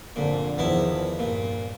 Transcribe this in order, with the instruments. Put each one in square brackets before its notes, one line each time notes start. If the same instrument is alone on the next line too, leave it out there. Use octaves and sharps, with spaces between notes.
[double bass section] G1 F2 D3 [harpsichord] A#2
[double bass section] E2 D#3 F3 [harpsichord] B3 E4
[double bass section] G2 [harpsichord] A#2